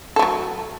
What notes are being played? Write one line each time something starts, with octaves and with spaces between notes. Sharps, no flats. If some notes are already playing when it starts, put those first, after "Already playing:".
F#3 A3 A4